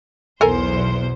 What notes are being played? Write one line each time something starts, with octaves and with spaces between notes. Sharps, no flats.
B1 E2 A4 A#4 C5 G#5